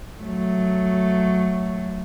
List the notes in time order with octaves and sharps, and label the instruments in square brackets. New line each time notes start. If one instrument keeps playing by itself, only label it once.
[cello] F#3 A3